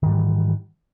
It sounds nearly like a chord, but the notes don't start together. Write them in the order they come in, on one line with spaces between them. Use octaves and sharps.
D#3 G#2 G3 E3